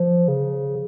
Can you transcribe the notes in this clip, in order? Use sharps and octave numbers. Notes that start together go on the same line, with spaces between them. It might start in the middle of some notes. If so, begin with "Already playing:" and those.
Already playing: F3
C#3